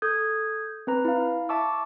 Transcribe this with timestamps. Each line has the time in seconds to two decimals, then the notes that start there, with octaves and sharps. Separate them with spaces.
0.02 A4 D#6 G6 G#6
0.87 C4 B4 A#5
1.05 E4 F5
1.49 E5 A5 C#6 D6 E6